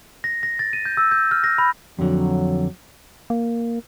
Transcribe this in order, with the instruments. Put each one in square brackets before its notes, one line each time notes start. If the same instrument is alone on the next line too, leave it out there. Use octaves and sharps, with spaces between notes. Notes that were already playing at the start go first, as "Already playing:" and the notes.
[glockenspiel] A#6
A#6
A6
D#7
G6
E6
G6
F6
A#6
B5
[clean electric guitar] F2 D3 [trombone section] F#3
[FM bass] A#3